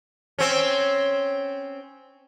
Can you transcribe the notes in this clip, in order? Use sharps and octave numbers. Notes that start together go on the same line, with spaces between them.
C4 C#4